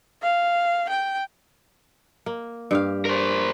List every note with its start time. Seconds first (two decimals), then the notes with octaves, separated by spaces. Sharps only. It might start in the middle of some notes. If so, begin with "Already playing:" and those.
0.22 F5
0.89 G5
2.26 A#3
2.71 G2 G4 F5
3.05 A#4 C5